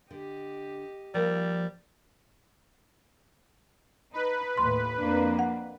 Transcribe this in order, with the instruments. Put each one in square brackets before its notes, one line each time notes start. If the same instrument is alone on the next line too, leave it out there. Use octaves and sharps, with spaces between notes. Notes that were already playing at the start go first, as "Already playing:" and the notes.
[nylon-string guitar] D3 [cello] G4 D#5
[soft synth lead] F3 [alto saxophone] G3 [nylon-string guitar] A#3 A#4
[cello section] D#4 [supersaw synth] B4
[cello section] D#2 A2 [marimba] C6
[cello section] F2 A#3 D4
[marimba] F#5